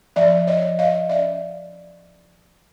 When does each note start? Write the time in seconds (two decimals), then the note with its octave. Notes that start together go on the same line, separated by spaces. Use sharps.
0.16 F3 D5 E5
0.47 C#5 D#5
0.63 F3
0.79 D#5 F5
1.09 C#4 D5 E5